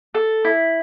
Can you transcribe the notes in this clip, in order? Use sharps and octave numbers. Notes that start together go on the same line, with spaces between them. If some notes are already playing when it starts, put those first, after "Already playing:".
A4
E4